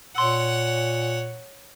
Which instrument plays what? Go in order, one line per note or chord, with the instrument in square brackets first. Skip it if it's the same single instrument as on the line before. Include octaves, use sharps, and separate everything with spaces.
[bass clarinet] A#2 [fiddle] C#5 F#5 [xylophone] C6 E6